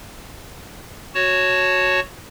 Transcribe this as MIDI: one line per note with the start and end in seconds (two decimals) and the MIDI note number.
1.15 2.00 66
1.15 2.00 73
1.15 2.00 81